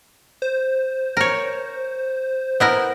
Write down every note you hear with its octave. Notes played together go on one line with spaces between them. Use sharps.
C5
A#4 C#5
B3 E4 A#4